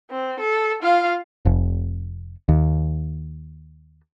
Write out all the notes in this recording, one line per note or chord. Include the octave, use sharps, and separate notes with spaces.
C4
A4
F4 F5
F1
D#2